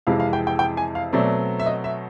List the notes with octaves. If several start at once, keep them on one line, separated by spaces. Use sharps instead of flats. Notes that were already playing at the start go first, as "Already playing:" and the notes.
F2 C3 E3 G#3 F5
F5
G5
G5
G5
G#5
F5
B2 F#3 A3 C4 D5
E5
D#5
E5